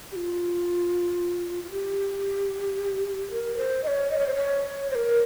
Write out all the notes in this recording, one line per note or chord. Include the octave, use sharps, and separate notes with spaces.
G4
F4
F4
G4
A#4
C5
D#5
C#5
D#5
C#5
C5
C#5
C5
A#4